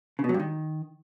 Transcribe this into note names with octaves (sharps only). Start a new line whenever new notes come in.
C#3
B2
F#3
G2
D#3